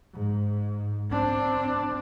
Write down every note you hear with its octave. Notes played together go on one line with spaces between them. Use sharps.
G#2
C4 D4